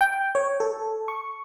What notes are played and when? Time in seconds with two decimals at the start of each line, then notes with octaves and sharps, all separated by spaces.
0.01 G5
0.35 C#5
0.60 A4
1.08 C#6